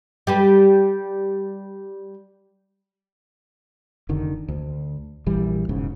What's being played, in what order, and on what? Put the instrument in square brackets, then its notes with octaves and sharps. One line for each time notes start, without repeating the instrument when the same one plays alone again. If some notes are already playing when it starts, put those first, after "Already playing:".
[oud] G3 G4 B4
[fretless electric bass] F1 D3 D#3
D2
A#1 E3 G3
E1 G#2 C#3